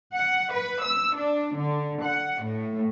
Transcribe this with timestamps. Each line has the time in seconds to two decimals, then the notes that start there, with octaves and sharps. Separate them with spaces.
0.15 F#5
0.53 B4
0.83 E6
1.16 D4
1.57 D3
2.04 F#5
2.44 A2